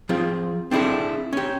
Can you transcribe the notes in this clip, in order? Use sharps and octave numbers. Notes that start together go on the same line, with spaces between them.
F3 C4 F4 G#4
C4 D4 E4 G#4 A4
C#4 G4